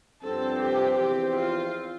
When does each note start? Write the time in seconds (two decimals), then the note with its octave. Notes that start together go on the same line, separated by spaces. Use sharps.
0.23 G2 D3 F3 C4 A4
0.60 G4
0.98 E2 C3 F3 C4 G4
1.36 F4